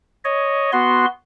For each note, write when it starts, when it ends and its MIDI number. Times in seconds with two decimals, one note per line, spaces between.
0.25 0.71 73
0.25 0.71 75
0.73 1.06 59
0.73 1.06 66
0.73 1.06 84